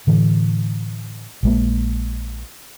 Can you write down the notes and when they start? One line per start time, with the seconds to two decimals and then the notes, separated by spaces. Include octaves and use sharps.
0.07 A2 D3 E3
1.43 A#1 G#3 A#3